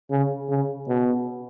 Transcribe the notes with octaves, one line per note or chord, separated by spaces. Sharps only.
C#3
C#3
B2